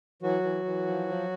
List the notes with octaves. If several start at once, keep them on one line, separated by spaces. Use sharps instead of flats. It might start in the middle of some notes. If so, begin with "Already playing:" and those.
E3 F#3 F#4
E3
E3
F3
F3